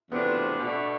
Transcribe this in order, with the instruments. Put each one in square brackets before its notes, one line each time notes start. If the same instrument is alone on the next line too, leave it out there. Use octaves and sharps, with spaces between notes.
[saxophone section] E2 C3 F3 A3 D4 [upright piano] B3
[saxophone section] B2 A3 D4